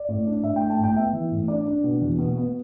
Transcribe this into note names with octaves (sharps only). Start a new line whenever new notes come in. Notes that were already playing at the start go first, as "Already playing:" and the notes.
Already playing: D5
A2
D4
A2 E5
G5
A3
A5
A2
G5
B3 E5
E3
A2
D4 D5
D4
B2
E2
B2
B3